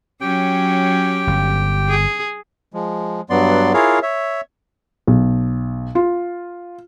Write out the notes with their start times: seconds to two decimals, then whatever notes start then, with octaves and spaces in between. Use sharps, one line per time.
0.21 F#3 C#4 G4 G5
1.27 G1
1.89 G#4
2.74 F3 G#3
3.30 G2 F#3 B3 D5 C6
3.74 E4 F4 G#4 A#4 C#5 F5
4.03 C#5 E5
5.07 B1
5.95 F4